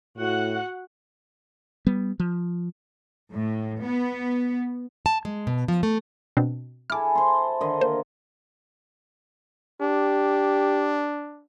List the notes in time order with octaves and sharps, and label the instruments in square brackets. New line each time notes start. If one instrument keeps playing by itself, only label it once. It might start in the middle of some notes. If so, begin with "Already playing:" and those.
[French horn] A2 [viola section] F#4 F#5
[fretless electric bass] G3 B3
F3
[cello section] A2
B3
[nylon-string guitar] A5
G#3
B2
F3
A3
[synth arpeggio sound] B2 C4 D4
[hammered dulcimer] E4 G#4 A4 [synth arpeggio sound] D6 F6
[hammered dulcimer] C5 A5 C6
D3 D#3 D#5
[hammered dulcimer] A#3 [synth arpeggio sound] C5
[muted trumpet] D4 [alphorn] G4